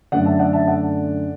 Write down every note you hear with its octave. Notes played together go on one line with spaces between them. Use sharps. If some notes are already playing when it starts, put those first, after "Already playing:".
F#2 D3 A3 D5 F#5
E5 A5
D5 F#5
E5 A5
D5 F#5